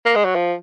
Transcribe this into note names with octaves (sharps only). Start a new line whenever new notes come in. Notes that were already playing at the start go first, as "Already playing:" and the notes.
A#3
G#3
F#3
F3